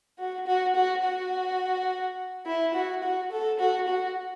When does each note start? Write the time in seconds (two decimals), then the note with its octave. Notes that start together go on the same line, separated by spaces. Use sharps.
0.19 F#4
0.47 F#4
0.75 F#4
1.04 F#4
2.46 E4
2.74 F#4
3.03 F#4
3.31 A4
3.59 F#4
3.88 F#4